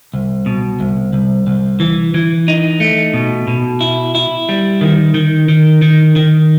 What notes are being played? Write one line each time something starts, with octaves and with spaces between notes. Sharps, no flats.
C2
B2
C2
C2
C2
E3
E3
D#4
A3
B2
B2
E4
E4
G3
D#3
D#3
D#3
D#3
D#3